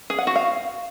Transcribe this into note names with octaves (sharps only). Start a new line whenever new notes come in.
G#4
F#5
F#4
F5